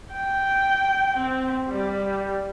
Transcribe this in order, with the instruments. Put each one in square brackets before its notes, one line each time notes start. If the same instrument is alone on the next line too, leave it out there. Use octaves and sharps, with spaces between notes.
[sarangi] G5
C4
G3